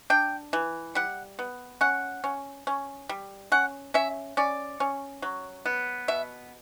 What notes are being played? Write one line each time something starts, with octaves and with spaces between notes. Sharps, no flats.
D4 G5
E3
G3 F#5
B3
C#4 F#5
C#4
C#4
G3
C#4 F#5
C#4 E5
C#4 D5
C#4
F#3
B3
B2 E5